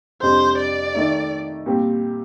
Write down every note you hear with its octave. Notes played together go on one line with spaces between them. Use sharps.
F2 C3 G3 D4 C5
D5
D#3 A3 D#4
A#2 G3 C4 G4